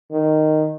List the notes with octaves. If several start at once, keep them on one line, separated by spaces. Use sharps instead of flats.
D#3